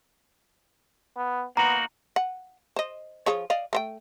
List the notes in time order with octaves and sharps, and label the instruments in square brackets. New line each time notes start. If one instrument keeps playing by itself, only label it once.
[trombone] B3
[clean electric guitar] A#3 D#4 F#4 [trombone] B3 [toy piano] A#5
[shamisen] F#5
C5 D#5
F3 G#4 C#5
D5 D#5 F5
A3 C5 G5